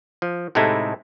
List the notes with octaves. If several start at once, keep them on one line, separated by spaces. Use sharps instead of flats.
F3
A2 C3 G#3 A3 D#4 E4